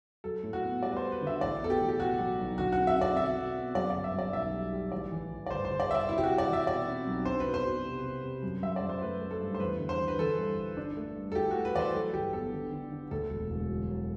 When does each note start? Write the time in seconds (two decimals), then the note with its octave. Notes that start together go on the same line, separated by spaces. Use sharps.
0.24 F#3 A4
0.43 A2
0.53 F#4
0.63 B3
0.83 G3 D5
0.91 B4
0.97 C5
1.02 G3
1.12 B4
1.21 D3
1.27 E5
1.41 A1 D5
1.61 B3 A4
1.70 G4
1.80 A1
1.89 G4
1.99 B2 F#4
2.19 F#3
2.39 B1
2.58 D3 F#4
2.72 C4 F#4
2.87 E5
2.97 C4 D5
3.17 B2 E5
3.36 B2
3.55 B3
3.75 F#2 D5
3.90 G1 D5
4.04 E5
4.14 F#2 D5
4.33 B1 E5
4.53 G3
4.73 G3
4.92 A1 D5
5.11 E3
5.31 A1
5.46 D5
5.51 G1 C5
5.65 C5
5.70 G1
5.80 D5
5.89 G1 E5
5.95 D5
6.09 C3 E4
6.18 G4
6.23 F#4
6.29 G3
6.38 D5
6.48 E3
6.53 E5
6.67 B2 D5
6.87 C4
7.07 B1
7.25 D4 C5
7.40 B4
7.46 B2
7.54 C5
7.65 B2
7.85 C3
8.04 C3
8.24 C3
8.43 F#2
8.62 F#2 E5
8.76 D5
8.82 F#2
8.89 C5
9.02 A3 B4
9.21 A3
9.31 A4
9.41 G2
9.54 C5
9.60 E2 B4
9.80 D3
9.89 C5
9.99 D3
10.08 B4
10.19 E3 A4
10.38 G2
10.58 G1
10.77 D4
10.97 A3
11.16 G2
11.32 A4
11.35 E4 G4
11.51 A3 F#4
11.65 B4
11.75 E3 D5
11.79 C5
11.94 F#3 A4
12.14 G1 G4
12.33 B3 A4
12.53 D3
12.72 D3
12.92 D3
13.11 D2 A4
13.31 E1
13.50 E1
13.70 F#3
13.89 F#3